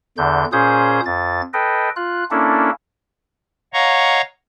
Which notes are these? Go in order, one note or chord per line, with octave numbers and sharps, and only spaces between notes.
E2 D3 G6
A#2 C#4 G#4 C5 D#6 G6
F2 A6
A4 B4 D#5 G5
F4 F#6
A#3 C#4 D4 E4 A4
C#5 D#5 F5 F#5 A#5 C#6